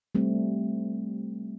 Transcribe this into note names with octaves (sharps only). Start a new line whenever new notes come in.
G3 A3 C4